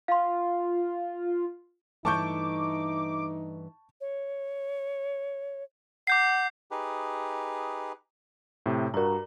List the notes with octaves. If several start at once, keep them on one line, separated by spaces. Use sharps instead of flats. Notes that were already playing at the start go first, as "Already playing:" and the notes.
F4 F5 C6
G2 E3 A3 D#4 A5 C#6 D6 G6
C#5
F#5 D6 G6 C7
D#4 G4 G#4 B4
A2 C3
G2 F#4 A#4 A#5